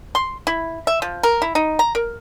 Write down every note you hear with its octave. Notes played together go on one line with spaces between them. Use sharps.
C6
E4
E5
F3
A#4
E4
D#4
A#5
A#4